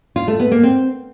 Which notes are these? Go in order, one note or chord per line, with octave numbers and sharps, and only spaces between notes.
F4
A3
B3
A#3
C4